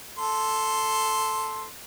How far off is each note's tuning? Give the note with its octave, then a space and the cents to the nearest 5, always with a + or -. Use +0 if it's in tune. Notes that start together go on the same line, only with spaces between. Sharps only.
A4 +0 C6 +0